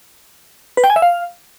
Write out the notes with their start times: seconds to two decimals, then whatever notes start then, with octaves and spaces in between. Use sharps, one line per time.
0.77 B4
0.84 G5
0.90 G#5
0.96 E5
1.02 F5